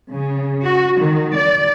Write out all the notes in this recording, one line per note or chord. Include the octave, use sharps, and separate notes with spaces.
C#3
F#4
D#3
D5